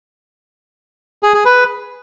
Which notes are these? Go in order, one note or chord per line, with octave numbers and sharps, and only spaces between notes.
G#4
G#4
B4